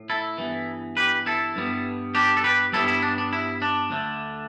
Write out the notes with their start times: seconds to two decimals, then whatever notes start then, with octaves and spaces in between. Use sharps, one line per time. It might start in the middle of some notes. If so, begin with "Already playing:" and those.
Already playing: A2
0.10 E4 A4
0.38 G2 E3 B3
0.97 G4 B4
1.26 E4 A4
1.56 G2 G3 B3
2.15 D4 G4
2.37 A4
2.44 G4 B4
2.73 G2 G3 B3 E4 A4
2.88 E4
3.02 D4
3.18 D4
3.33 E4
3.62 D4
3.91 D2 D3 A3